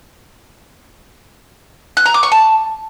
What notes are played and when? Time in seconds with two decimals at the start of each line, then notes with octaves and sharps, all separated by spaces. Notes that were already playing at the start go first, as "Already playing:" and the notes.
1.97 F#6
2.06 A#5
2.14 D6
2.23 C#6
2.32 A5